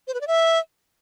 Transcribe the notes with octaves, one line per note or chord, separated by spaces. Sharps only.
C5
B4
D5
E5